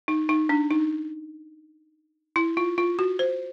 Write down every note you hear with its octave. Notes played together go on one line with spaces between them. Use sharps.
D#4
D#4
D4
D#4
E4
F4
F4
F#4
C5